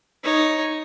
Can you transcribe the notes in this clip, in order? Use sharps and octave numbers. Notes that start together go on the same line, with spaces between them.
D#4 C#5